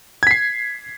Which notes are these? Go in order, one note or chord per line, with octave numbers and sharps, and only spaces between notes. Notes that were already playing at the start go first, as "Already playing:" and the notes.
G#6 B6 C7